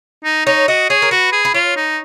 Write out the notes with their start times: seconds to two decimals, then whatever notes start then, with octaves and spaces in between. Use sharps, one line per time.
0.25 D#4
0.46 D#4 C#5
0.68 F#4 D#5
0.90 G#4 C#5
1.02 A#4
1.11 F#4 B4
1.32 G#4
1.45 B4
1.54 F4 C#5
1.77 D#4